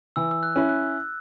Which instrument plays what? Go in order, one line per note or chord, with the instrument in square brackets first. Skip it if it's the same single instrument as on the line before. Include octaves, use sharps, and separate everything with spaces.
[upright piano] E3 [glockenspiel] E6
[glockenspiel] E6
F#6
[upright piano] C#4 E4
[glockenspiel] F#6